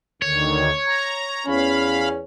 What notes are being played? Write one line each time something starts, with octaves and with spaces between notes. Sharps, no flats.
D2 D3 D#3 C#5
A#5
E2 C#4 F5 B5